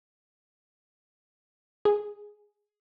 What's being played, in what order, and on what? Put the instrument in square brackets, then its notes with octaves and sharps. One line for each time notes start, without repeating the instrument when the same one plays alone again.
[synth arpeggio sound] G#4